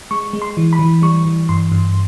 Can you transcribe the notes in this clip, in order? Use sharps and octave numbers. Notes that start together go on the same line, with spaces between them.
G#3 C#6
G#3
C6
E3
B5
E3
G3 C#6
E3
G2 C6
G2